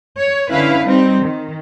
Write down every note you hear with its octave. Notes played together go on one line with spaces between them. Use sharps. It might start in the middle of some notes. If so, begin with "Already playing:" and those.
C#5
D3 C#4 E4 B4 F5
G3 C4 D#4
D#3